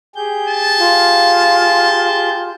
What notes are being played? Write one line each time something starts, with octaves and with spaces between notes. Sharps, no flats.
G4 G#4 G6
A5
F4